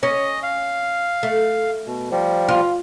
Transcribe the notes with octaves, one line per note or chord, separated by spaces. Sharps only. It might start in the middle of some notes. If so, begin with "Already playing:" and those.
C#4 D#5
F5
A3
B2
F3 G3
F4